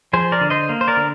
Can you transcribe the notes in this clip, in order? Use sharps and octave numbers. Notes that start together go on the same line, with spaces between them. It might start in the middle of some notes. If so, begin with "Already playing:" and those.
F3 G#4 C5
A#4 D5
D3
C5 D#5
A#3
C5
A#4 D5
D3